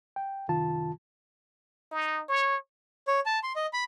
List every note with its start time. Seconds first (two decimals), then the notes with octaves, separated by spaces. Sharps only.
0.16 G5
0.48 C2 F#2 C3 D#3 F4 A5
1.91 D#4
2.29 C#5
3.08 C#5
3.26 A5
3.43 C6
3.56 D#5
3.73 B5